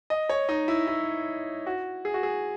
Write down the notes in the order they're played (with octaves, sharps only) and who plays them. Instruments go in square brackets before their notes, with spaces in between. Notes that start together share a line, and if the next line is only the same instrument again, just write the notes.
[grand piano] D#5
C#5
D#4
E4
E4
F#4
G#4
F#4
G#4